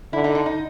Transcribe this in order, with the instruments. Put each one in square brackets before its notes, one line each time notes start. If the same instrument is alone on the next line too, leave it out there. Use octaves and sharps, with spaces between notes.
[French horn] D3 [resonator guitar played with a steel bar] E4
[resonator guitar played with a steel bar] D#4
D#4
D#4